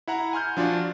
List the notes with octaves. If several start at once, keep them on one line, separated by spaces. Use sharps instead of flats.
E4 F#5 A#5
G#5 C6 F6 G6
F3 D4 F4 F#4 D5